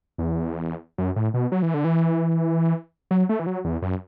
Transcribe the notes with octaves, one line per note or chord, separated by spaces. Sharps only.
E2
F#2
A2
B2
F#3
E3
D3
E3
F#3
A3
E3
F#3
E2
F#2